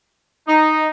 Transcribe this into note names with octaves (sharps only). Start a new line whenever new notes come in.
D#4